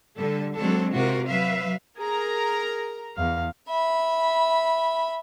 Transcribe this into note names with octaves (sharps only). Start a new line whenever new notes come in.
D3 G3 A4
F#3 G#3 C4 D4 A4
C3 F4 F#4 A#4
F#3 B4 E5 F5
G#4 A#4 A#5
E2 F5
E5 B5